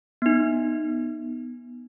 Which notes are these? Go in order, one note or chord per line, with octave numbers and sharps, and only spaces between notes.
B3 D#4